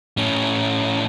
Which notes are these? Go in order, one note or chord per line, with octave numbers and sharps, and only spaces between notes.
A2 C#4